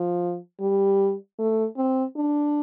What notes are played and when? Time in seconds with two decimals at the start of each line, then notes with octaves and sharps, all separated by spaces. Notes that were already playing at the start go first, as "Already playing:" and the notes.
Already playing: F3
0.61 G3
1.39 A3
1.77 C4
2.16 D4